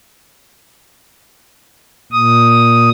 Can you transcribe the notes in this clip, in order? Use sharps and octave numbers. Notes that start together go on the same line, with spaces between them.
A#2 D#6